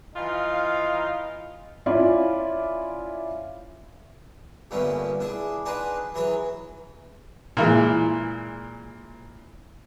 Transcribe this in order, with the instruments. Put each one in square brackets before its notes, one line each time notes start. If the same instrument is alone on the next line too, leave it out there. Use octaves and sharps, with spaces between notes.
[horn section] E3 D#4 F4 F5
[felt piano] C#4 E4 F4 D5
[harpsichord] G2 A#2 D3 A3 B3 C#4
D4 E4 G#4
D4 D#4 G#4 B4 C5 F#5
E3 F#3 E4 G#4 C#5
[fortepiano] A#2 E3 G#3